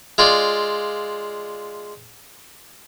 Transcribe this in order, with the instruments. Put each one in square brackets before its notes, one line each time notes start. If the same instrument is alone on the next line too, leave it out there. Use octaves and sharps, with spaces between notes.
[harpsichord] G#3 F4 D5